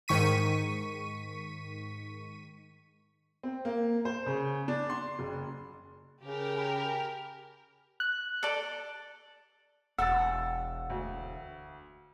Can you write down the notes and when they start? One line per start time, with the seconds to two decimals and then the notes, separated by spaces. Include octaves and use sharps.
0.08 G#2 D#3 C#6 B6 D#7
3.43 C4
3.65 A#3
4.05 C5
4.26 C#3
4.68 D4
4.90 C6
5.19 F#1
6.24 C#3 G4 A#4
6.55 G5 G#5 B5
8.00 F#6
8.43 A4 D5
9.98 E1 F#5 E6 A6
10.90 D2